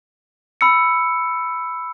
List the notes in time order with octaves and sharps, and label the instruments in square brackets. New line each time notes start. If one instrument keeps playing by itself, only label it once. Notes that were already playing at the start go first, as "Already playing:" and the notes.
[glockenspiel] B5 E6 C#7